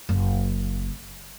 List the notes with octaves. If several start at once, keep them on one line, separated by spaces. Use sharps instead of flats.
F#1